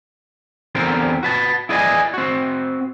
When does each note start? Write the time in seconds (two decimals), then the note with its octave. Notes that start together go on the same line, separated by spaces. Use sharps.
0.75 E2 D3 G3 C4 A#4
1.23 F#4 B4 A5
1.69 E4 G#4 B4 D5 D#5 G#5
2.14 C4 F#4